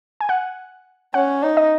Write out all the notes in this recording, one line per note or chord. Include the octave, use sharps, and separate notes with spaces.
G#5
F#5
C#4 F#5
D#4
D#5